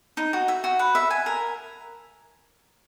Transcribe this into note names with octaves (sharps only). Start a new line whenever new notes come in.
D#4
F#4
E5
F#4
B4
E5
G#5
A#4